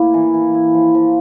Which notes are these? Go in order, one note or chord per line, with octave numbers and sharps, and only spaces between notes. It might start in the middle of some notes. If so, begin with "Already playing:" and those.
Already playing: A2 A#3 E4
E3
E3
E4
F3
F3